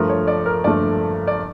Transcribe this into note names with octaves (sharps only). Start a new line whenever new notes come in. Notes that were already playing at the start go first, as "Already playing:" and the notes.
Already playing: G2 F3 A3 A#4
C#5
D5
A#4
G2 F3 A3 D5
D5